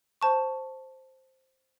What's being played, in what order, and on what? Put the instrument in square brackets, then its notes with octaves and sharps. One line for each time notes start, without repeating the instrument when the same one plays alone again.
[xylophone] C5 A5 C#6